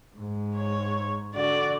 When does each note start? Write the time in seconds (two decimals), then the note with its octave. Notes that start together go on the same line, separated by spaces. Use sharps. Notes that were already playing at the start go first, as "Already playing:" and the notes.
0.16 G#2
0.55 C#5
1.34 D3 F#4 D5